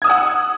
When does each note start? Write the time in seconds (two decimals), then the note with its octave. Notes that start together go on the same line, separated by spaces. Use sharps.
0.02 G#6
0.04 D#6
0.07 E6
0.09 F#5